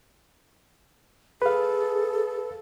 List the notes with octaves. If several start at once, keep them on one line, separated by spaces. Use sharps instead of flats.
G#4 A4 B4 F5